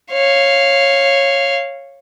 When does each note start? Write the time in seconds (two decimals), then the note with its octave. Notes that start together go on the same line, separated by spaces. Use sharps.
0.12 C#5 F5